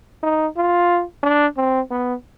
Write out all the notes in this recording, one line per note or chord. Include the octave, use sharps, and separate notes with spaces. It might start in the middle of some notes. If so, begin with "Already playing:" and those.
D#4
F4
D4
C4
B3